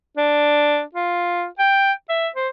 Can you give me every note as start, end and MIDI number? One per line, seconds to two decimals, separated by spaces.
0.17 0.82 62
0.94 1.45 65
1.59 1.92 79
2.09 2.28 76
2.36 2.48 72